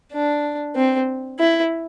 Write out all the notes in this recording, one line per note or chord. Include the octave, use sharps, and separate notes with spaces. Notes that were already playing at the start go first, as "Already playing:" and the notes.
D4
C4
E4